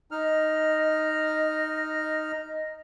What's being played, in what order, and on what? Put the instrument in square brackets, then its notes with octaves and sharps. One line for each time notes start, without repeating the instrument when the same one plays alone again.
[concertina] D#4 F6 [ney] D#5